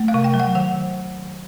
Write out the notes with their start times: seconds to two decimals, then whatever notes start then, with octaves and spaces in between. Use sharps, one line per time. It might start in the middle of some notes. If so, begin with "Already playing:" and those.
Already playing: A3
0.08 F5
0.14 C3
0.24 G5
0.34 F#3
0.40 F#5
0.55 D#3 F#5